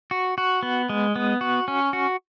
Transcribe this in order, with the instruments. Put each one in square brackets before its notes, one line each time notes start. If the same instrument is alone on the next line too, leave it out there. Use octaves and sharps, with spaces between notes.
[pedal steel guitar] F#4
F#4
B3
G#3
B3
F#4
C#4
F#4